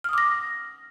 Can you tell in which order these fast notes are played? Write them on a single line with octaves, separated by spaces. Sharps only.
F6 D#6 D6 A#6